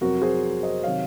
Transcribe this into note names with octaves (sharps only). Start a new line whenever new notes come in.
F2 C3 F#3 F#4 A#4
G#4 C5
C5 D#5
C3 D#3 F#3 C#5 F5